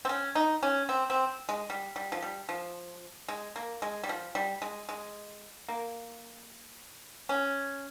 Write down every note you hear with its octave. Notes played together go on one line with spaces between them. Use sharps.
C4
C#4
D#4
C#4
C4
C4
G#3
G3
G3
F3
G3
F3
G#3
A#3
G#3
G3
F3
G3
G#3
G#3
A#3
C#4